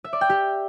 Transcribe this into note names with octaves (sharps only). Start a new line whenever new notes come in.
E5
D5
G5
G4